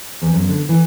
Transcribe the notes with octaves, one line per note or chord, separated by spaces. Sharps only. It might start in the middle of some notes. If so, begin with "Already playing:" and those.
E2
F#2
D3
E3